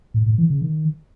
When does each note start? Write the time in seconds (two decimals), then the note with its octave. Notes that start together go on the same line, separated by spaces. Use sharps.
0.14 A2
0.26 A2
0.38 E3
0.50 C#3
0.62 D#3